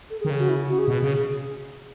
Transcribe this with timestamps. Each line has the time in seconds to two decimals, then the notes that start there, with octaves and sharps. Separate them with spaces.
0.10 A4
0.20 G#4
0.25 D#3
0.30 C#3
0.39 F#4
0.49 E4
0.69 F#4
0.79 G#4
0.88 B2
1.03 C#3